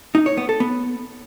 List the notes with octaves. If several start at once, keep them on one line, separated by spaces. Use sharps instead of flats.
D#4
C#5
B3
A4
B3